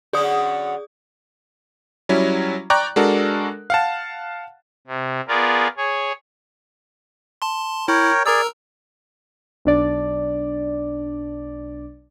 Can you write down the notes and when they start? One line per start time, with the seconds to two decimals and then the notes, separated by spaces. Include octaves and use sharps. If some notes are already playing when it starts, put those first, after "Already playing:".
0.13 D3 F#3 C#4 G#4 D5 D#6
2.09 F#3 G3 C#4 E4
2.70 D5 G5 A#5 C#6 F#6
2.96 G#3 D4 F#4 A4 A#4
3.70 F5 F#5 A5
4.87 C3
5.28 B3 F4 G#4 A#4 D5
5.77 G#4 C#5
7.42 A5 C6
7.88 E4 A#4 C#5 G5
8.26 G#4 A#4 D5 A#5 E6
9.65 B1 D4 D5